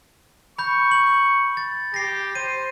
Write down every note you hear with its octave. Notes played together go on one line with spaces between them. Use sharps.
B5 C#6 G6
F#7
A6
G4 A#6 C7
C5 D#7